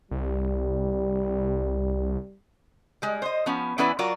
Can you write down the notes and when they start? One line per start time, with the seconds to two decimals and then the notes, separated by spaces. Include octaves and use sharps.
0.11 C2 G3
3.02 G3 G#3
3.22 C5 D#5
3.46 F3 B3 C#4
3.78 E3 B3 C#4 E4 B4 D5
3.99 F#3 F4 F#4 A#4 D5